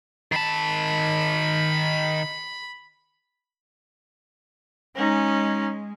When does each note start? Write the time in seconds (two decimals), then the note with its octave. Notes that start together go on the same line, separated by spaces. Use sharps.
0.32 D#3 A5 B5
4.96 G#3 C#4 D#4